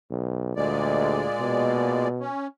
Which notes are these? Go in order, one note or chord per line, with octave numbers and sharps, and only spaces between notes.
B1
D2 A#2 G#3 D5
B2
C#4